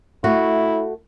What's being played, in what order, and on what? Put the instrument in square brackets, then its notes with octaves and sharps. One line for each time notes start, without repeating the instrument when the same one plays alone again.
[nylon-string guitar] A3 F#4 [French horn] E4